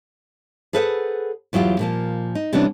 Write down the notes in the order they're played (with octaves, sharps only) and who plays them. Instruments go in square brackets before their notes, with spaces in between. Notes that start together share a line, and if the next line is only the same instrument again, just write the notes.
[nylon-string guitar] G#4 A4 B4 C5 F5 F#5
E2 F#3 E4 F4 G4
A#2 F3 A#3
D#4
C3 E3 G3 B3 C#4 D4